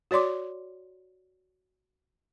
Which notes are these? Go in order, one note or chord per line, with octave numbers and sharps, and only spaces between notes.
F#4 C#5 D5 C6 D6